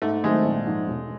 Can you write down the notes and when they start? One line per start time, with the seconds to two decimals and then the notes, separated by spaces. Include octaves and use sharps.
0.02 G#2 A3
0.24 D#3 F#3 G#3 A3 C4
0.45 A#1
0.66 G#2 F3
0.87 E1